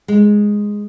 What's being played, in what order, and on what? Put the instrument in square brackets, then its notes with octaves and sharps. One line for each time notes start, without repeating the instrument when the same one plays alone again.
[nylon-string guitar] G#3